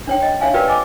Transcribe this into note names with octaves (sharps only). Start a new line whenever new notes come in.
D4 C#5 G5
D#5 G5
D4 C#5 E5 F5 G#5
F4 G4 A#4 B4 D5 G5
D#5 G#5 D6